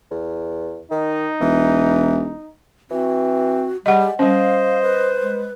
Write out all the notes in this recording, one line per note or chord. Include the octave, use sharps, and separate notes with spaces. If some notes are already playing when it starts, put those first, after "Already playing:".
E2
D#3 D#4
E1 E3
E3 C4 F#4
G3 G#3 G4 D#5 F#5
G3 C#4 C5 D#5 F5
B4
G#3